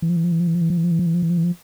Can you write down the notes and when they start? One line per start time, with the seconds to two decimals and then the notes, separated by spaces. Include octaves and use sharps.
0.02 E3
0.09 F3
0.16 E3
0.24 F3
0.32 E3
0.40 F3
0.47 E3
0.55 F3
0.61 E3
0.70 F3
0.77 E3
0.84 F3
0.91 E3
0.99 F3
1.06 E3
1.14 F3
1.22 E3
1.30 F3
1.38 E3
1.44 F3